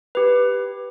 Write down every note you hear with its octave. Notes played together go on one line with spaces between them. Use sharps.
G4 B4